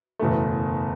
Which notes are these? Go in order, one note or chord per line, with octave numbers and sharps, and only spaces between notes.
F#1 E2 B2 A3